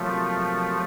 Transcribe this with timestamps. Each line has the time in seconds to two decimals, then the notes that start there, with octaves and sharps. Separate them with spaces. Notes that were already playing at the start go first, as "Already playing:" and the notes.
Already playing: C3 F3 F#3 A3 A#3 F4